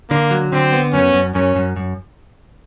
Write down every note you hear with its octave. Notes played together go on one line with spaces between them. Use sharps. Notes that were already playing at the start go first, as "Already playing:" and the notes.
D3 A#3
F#3
D3 C4
B3
F#2 C#4
F#2
F#2 C#4
F#2
F#2